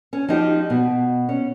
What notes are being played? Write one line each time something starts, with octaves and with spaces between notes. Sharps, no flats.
C#4
F3 D#4 G4
B2
C#4